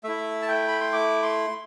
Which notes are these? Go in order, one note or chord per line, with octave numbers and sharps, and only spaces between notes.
A3 E4 E5
A5
G5
B5
C6
D6
C6